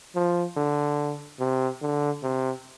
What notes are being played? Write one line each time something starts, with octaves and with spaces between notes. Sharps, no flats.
F3
D3
C3
D3
C3